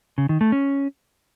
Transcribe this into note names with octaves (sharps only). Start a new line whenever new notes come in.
C#3
D#3
A3
C#4